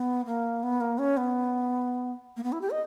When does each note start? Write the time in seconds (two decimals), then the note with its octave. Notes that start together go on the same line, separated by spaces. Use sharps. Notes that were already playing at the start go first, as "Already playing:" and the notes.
Already playing: B3
0.26 A#3
0.63 B3
0.81 A#3
0.98 C#4
1.17 B3
2.37 A#3
2.43 B3
2.52 E4
2.61 G4
2.70 D#5